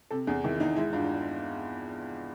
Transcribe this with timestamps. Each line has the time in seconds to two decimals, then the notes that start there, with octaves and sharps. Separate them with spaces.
0.10 C3 A4
0.27 E2 G#4
0.44 D#3 E4
0.56 E4
0.60 E2 D#4
0.76 G#3 E4
0.93 G2 F4